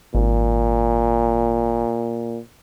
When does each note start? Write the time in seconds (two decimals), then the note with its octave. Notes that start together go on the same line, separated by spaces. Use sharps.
0.15 G#1 A#2